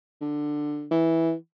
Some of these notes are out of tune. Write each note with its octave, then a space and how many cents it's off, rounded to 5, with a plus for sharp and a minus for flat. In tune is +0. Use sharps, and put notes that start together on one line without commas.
D3 +10
E3 -5